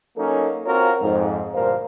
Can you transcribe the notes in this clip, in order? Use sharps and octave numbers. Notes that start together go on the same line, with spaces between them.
F#3 A#3 C#4 D#4 A4
C4 F4 F#4 A#4 C#5 F5
F2 G#2
D2 G2 A#2 A#4 C5 F5